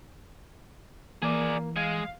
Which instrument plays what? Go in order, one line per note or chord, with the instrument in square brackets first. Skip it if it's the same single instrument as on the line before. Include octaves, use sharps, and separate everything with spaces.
[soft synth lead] E3 [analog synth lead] A#3 [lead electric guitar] G#4 D5
[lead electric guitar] G#3 [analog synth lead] F5